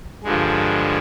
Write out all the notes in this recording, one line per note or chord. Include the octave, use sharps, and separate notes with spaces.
G2 D3 F3 G#3